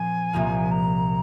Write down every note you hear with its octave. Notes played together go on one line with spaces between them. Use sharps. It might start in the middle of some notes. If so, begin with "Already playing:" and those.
Already playing: A#2 F3 C4 G#5
C2 A#2 F3 A#3
A#5